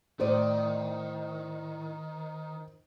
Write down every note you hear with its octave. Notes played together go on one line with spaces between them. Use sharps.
A2 D#3 C5 D5 D#5